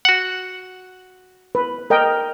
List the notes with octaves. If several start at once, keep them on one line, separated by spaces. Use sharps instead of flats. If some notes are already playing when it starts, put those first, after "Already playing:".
F#4 F#5
B4
A#4 D#5 G5